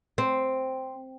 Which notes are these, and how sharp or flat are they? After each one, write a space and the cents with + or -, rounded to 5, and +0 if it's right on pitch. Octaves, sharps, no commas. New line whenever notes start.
C4 +0